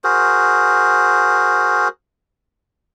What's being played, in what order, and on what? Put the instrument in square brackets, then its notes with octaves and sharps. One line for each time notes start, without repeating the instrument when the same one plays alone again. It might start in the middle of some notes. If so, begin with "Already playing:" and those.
[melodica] F#4 G#4 A#4 C5